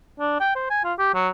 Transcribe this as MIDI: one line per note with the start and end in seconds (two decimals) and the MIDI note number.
0.20 0.37 62
0.40 0.53 79
0.55 0.69 72
0.70 0.81 80
0.84 0.93 65
0.99 1.10 67
1.14 1.28 54